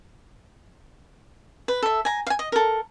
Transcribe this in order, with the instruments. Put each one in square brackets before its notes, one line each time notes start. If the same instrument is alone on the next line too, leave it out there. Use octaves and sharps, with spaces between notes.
[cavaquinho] B4
A4 E5
G#5 A#5
F5 G#5
D#5
A4 A#4